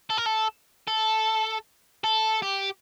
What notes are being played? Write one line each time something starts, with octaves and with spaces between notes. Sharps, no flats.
A4
A#4
A4
A4
A4
G4